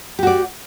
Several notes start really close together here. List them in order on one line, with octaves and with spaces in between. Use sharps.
G4 F#4 D5